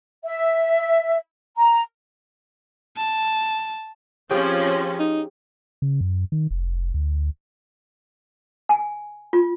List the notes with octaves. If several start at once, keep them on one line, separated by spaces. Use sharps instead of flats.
E5
A#5
A5
F3 C4 C#4 G4 G#4 C#5 G5
D#4
C#3
F#2
D#3
F1
D2
G#5
F4